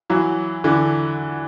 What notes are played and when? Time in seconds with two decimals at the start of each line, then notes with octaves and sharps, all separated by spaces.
0.10 E3 F#3
0.64 D3 E3